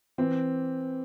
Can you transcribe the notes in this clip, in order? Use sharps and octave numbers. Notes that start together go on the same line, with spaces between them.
E3 C4